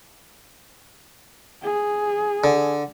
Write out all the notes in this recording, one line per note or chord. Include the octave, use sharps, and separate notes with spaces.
G#4
D3